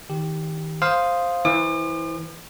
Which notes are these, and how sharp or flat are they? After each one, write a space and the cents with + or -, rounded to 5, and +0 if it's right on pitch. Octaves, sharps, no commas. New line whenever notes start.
D#3 +30 G4 +0
C5 +0 F5 +0 D#6 +0
E3 -15 C5 +0 D6 +45